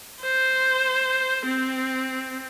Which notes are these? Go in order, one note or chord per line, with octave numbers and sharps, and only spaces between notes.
C5
C4